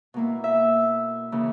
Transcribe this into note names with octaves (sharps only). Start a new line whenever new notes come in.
B2 A#3 E4
E5
C#3 E3 A#3